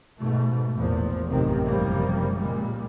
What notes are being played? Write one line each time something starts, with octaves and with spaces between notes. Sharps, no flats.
G#2 B2 A3
A1 E2 A#2 F3
A1 F#2 C3 D#3 C4
F#1 C3 F3 G3 A#3
C#2 A#2 G3 G#3